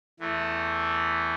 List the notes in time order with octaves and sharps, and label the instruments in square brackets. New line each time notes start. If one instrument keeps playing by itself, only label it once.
[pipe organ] E2 E3 A3